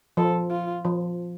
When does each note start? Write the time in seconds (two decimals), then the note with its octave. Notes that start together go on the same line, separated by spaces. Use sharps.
0.17 F3 A4
0.50 F4
0.85 F3